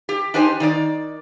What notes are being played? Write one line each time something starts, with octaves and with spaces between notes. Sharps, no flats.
G4
D4 D#4 G4 C5 G#5
D#3 D#4 D5